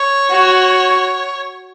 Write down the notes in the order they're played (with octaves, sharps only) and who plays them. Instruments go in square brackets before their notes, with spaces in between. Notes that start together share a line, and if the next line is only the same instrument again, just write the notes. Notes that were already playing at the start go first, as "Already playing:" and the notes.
Already playing: [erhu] C#5
[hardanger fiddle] F#4